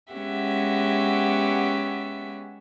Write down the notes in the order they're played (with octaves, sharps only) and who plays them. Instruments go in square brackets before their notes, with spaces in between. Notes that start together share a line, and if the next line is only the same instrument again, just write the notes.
[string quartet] G#3 B3 C#4 G4 E5 F#5